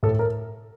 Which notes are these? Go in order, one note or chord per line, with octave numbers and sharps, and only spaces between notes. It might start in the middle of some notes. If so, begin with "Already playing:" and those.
A2 A4
A#4